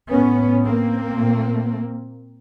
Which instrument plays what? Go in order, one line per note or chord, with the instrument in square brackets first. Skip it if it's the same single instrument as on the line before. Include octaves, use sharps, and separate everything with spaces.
[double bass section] A2 B3 C#4
A#3 C4
A#2